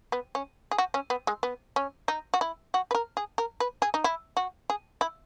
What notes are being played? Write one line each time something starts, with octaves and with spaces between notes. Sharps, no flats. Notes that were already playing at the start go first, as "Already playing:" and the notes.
B3
C#4
G#4
F#4
C#4
B3
G#3
B3
C#4
D#4
F#4
E4
F#4
B4
A#4
G#4
A#4
B4
G#4
D#4
E4
F#4
G#4
E4